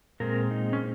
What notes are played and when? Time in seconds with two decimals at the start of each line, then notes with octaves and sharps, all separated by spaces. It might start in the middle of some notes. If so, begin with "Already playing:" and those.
0.20 A#2 G#3 C4 A#4
0.51 D#4
0.73 C#4